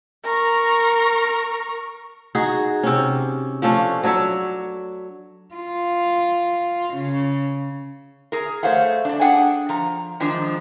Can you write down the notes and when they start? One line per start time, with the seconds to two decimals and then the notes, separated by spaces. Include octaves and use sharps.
0.24 A#4 A#5 C#6
2.35 D#4 F#4 G#4
2.83 C3 C#4
3.62 F3 A3 C#4 D4
4.03 F#3 D4 C#5 E5
5.54 F4
6.93 C#3
8.32 G#4 A#4
8.63 A3 C5 C#5 F5 F#5
9.05 D4 D5
9.21 D4 G#4 F#5 G5
9.69 F3 A#5
10.20 D#3 F3 G#3 D4